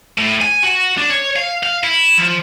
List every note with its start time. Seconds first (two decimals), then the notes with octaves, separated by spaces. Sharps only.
0.18 A2
0.42 G#5
0.64 F#4
0.98 D4
1.10 C#5
1.36 F5
1.63 F5
1.84 E4
2.18 F3